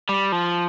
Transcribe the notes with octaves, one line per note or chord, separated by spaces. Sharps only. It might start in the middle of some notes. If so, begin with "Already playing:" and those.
G3
F3